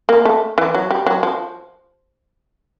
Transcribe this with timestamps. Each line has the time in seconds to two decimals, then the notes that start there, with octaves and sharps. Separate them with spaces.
0.09 A#3
0.25 A3
0.58 E3
0.74 F#3
0.91 G3
1.06 F#3
1.23 F3